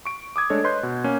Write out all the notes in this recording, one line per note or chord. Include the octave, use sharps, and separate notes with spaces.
C#6 D7
D6 D#6 G#6
G#3 A3 D4 A4 C#5 D#5
B4 C#5 D#5 C6 F#6 G6
B2
A#3 C#4